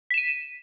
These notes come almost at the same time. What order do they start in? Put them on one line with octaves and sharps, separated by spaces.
B6 E7 D#7